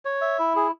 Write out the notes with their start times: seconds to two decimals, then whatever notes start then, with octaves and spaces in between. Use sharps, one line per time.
0.05 C#5
0.21 E5
0.39 E4
0.56 G#4